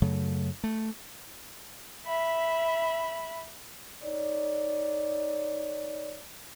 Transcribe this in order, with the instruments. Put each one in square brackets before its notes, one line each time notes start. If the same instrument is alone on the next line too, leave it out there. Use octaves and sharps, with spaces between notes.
[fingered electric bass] F#2 C#3 F#3 A3
A3
[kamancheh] E5 B5
[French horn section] D#4 C#5 D5